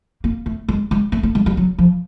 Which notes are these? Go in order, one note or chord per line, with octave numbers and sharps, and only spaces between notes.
A#3
A3
G#3
G#3
A3
A3
G#3
G3
F#3
F3